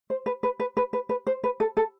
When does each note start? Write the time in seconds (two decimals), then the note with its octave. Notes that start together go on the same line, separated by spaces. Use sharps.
0.10 C5
0.26 B4
0.43 B4
0.60 B4
0.77 B4
0.93 B4
1.09 B4
1.27 C5
1.44 B4
1.60 A4
1.77 A4